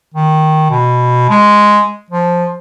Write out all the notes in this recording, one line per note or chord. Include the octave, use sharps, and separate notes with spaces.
D#3
B2
G#3
F3